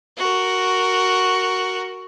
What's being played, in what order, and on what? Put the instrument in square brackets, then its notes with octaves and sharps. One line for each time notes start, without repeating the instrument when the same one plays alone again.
[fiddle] F#4 A#4